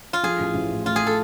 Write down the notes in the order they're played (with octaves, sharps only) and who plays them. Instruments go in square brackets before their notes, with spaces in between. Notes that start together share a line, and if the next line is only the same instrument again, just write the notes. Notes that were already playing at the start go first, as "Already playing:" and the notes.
[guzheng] F4
[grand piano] F3 [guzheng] G#4
[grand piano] A1
A1
A2
[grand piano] A3 [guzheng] F4
[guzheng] G#4
A4